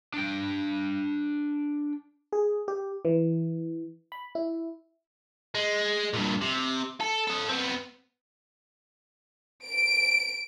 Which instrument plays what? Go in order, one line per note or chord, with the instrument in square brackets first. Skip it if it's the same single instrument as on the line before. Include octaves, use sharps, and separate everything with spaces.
[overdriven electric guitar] D4 G5
[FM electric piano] G#4
G4
E3
B5
E4
[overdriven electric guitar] G#3
G2 A#2
C3
A4
A4 D#5
B3 C4
[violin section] D7